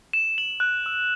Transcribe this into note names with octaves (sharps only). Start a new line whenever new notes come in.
E7
F#7
F#6
E6